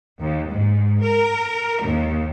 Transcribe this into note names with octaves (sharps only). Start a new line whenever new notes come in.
D#2
G#2
A#4
D#2